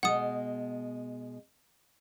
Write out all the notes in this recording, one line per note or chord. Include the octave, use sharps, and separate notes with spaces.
B2 G#3 F#5 D#6